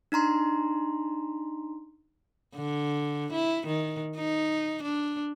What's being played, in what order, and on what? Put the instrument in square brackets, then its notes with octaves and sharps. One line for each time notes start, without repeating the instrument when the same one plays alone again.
[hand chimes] D4 D#4 A#5 C6
[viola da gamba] D3
E4
D#3
D#4
D4